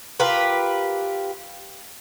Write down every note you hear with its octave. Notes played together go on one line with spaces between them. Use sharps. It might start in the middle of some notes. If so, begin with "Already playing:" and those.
F4 G4 A#4 B4